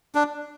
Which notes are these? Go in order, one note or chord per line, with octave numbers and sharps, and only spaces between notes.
D4